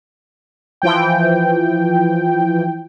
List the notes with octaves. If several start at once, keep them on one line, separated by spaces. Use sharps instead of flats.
E3 F3 G5